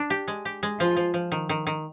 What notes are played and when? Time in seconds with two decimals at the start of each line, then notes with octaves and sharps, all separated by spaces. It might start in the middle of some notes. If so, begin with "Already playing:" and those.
Already playing: D4
0.10 G4
0.28 G#3
0.45 G4
0.63 G#3
0.79 F3 F4
0.97 F3
1.14 F3
1.32 D#3
1.49 D#3
1.67 D#3